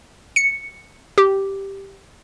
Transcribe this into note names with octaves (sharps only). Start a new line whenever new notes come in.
C#7
G4